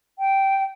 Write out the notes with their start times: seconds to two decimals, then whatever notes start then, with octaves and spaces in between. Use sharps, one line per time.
0.19 G5